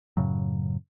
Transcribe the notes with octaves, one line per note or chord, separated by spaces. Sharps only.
F#2 A2 C#3 F#3